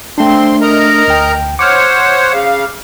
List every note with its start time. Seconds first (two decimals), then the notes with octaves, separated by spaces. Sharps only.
0.18 A3 C4 D4 C6
0.61 A#4 D#5 A#5
1.08 D2 G5
1.59 C5 C#5 F#5 D6 F6
2.32 C#3 F5